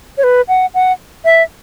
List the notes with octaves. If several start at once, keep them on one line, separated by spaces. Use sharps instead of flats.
C#5
B4
F#5
F#5
E5